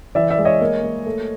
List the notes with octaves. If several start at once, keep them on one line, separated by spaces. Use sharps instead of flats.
E3 D5 E5
D5 E5
G#3
C#5 D#5
A#3
A#3
A3